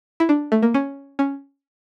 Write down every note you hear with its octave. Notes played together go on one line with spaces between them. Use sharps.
E4
D4
A3
A#3
C#4
C#4